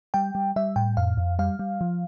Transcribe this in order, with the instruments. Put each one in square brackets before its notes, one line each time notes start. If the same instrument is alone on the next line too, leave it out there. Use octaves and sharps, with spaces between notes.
[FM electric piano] G3 G5
G3
G3 E5
A2 G5
F2 F5
F2
G3 F5
G3
F3